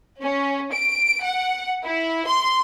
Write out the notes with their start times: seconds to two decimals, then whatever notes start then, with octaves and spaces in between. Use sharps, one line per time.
0.21 C#4
0.72 D7
1.23 F#5
1.84 E4
2.27 C6